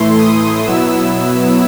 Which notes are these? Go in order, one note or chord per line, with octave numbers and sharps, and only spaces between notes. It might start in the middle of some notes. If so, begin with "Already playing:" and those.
Already playing: A2 E3 A3 E4 C6
D#6
B2 F#3 B3 E4 E6